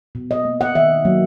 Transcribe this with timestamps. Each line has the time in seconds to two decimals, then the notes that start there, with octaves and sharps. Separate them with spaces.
0.15 B2
0.31 D#5
0.45 A#3
0.61 F#5
0.75 D#3 E5
1.05 F#3 A#3